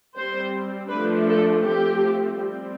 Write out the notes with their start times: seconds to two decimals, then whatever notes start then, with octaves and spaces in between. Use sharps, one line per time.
0.17 G3 C4 C5
0.90 F3 A3 D4 B4
1.27 A4
1.64 F3 A3 C4 G4
2.37 G3 C4